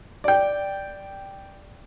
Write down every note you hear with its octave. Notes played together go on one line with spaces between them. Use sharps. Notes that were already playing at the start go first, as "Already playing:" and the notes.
D5 G5